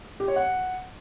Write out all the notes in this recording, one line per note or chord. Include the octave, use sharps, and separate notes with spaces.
G4
C#5
F#5